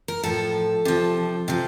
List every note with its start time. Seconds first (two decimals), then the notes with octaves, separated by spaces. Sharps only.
0.08 A#4
0.23 A2 F3 A4
0.85 C3 F3
1.48 C3 F3